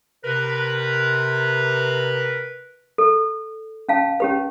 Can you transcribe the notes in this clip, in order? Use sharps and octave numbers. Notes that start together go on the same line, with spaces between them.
C3 A#4 B4
A4
C#4 F5 A5
C#4 G4 B4